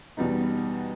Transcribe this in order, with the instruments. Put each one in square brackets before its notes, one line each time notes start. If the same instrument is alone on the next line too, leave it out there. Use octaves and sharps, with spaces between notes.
[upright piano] E2 B2 G3 B3 D#4